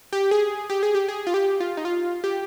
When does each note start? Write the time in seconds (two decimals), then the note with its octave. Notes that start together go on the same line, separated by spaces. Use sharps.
0.13 G4
0.31 G#4
0.70 G4
0.83 G#4
0.95 G4
1.09 G#4
1.27 F4
1.34 G4
1.60 F4
1.77 D#4
1.85 F4
2.24 G4